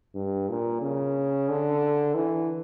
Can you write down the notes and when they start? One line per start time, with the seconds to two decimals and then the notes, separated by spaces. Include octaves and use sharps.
0.15 G2
0.49 A#2
0.82 C#3
1.49 D3
2.15 E3